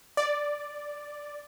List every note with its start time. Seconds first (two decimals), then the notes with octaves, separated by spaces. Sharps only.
0.17 D5